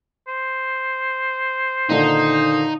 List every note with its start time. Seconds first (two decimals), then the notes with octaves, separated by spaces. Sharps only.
0.28 C5
1.89 A#2 D3 D#3 D#4